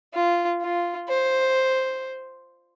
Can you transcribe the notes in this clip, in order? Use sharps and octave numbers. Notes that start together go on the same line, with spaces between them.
F4
F4
C5